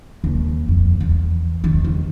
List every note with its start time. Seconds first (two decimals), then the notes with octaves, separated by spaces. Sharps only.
0.24 D#2
0.68 F2
1.00 E2
1.64 D#3
1.84 D#2